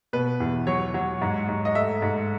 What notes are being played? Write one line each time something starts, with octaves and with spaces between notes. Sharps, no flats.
B2 B4
E2
F#3 C#5
F#3
G#2
G#2
D#5
A3 E5
G#2